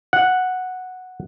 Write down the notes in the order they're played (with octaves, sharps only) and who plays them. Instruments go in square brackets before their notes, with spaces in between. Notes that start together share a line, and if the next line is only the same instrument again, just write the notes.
[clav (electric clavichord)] F#5